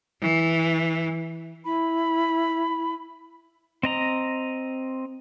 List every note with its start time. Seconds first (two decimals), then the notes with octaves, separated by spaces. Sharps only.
0.22 E3
1.64 E4 B5
3.83 C4 D#5 A#5